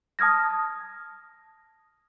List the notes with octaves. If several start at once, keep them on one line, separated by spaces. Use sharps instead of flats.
A5 D#6 F6 G#6 A#6